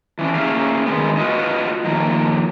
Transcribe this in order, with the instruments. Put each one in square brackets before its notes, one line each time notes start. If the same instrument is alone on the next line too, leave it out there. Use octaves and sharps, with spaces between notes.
[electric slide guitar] E3 C#4 D4
A#3 C#4 G#4 E5 F5
D#3 G#3 B3
F4 F#4 B4 D#5
D#3 F3 A#3